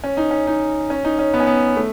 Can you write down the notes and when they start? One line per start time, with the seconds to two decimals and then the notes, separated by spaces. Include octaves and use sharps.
0.04 C#4
0.17 D#4
0.31 C#4
0.47 D#4
0.90 C#4
1.04 D#4
1.19 C#4
1.34 B3
1.40 C#4
1.47 B3
1.76 A3